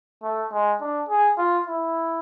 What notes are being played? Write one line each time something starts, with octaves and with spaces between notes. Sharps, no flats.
A3
G#3
D4
G#4
F4
E4